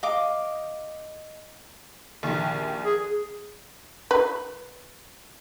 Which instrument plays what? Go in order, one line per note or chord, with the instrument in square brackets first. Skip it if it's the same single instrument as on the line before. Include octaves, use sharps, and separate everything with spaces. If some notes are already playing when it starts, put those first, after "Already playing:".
[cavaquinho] D#5 F5 D6
[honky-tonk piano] A#1 D#2
[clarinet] G#4
[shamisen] B4